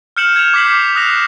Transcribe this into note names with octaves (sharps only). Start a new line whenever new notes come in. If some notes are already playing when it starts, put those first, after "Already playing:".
F6 G6 C#7 E7 F#7
G#6 E7 F7
D6 G6 B6 C7 F#7
D#6 F#6 A#6 F7